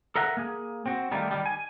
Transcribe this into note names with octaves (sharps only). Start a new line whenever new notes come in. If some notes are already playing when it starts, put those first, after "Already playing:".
A4 A#4 E5 F#5
A#3 G#4
C4 F#4
D#3 G3 A3 A#3
D#3 G3
G#5